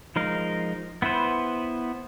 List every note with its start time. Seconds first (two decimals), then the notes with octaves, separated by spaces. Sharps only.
0.16 F3 G#3 D#4 A#4 F5
1.02 B3 E4 B4 C5